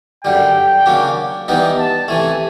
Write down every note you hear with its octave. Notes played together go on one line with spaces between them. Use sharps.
F#2 D3 G3 G5
C#3 F#3 A#3 D4
E3 G3 B3 D#4 G5
A5
C3 E3 A3 G#5